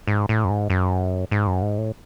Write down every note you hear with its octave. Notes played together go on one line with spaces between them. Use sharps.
G#2
A2
F#2
G#2
F#2
G#2
F#2
G#2
A2